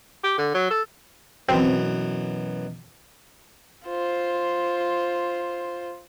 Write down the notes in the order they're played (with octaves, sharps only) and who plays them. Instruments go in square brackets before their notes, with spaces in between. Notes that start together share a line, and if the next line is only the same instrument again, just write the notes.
[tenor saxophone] G4
D3
F#3
A4
[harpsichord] F#2 B2 E3 [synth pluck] C4
[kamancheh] F4 C5